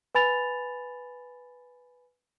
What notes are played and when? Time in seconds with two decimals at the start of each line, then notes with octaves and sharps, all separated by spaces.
0.15 B4 G#5 B5 A6 F7